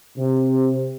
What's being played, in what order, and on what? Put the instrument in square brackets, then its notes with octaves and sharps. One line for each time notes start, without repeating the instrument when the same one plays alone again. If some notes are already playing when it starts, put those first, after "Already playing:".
[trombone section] C3